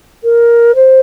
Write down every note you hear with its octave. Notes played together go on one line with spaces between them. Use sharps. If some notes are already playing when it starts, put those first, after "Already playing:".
A#4
C5